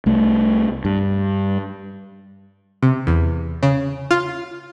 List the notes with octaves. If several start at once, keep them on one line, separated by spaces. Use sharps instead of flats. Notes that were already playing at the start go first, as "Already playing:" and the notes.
C2 A3
G2
C3
E2
C#3
F4